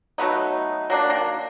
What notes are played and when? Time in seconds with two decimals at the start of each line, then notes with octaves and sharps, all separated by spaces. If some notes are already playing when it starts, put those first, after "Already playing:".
0.18 F#3 A3 B3 D#4
0.90 F#3 A#3 D4
1.10 D#3 A#3